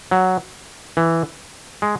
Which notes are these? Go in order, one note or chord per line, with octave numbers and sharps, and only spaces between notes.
F#3
E3
G#3